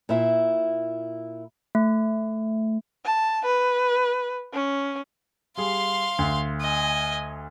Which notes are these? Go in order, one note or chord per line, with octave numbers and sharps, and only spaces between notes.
A#2 E4 E5
A3
A5
B4
C#4
G3 G#4 F5 C6
D2
D#5 G#5